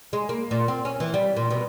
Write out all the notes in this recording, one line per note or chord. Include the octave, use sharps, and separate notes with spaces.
G#3
A#3
A#2
C4
C#4
E3
G3
A#2
B2